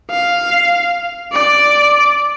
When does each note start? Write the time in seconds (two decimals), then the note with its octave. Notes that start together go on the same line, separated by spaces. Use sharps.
0.10 F5
1.32 D5